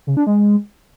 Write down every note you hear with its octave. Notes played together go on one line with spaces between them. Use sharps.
C#3
D4
G#3